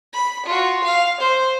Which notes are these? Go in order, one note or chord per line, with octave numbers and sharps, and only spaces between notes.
B5
F4 F#4
F5
C5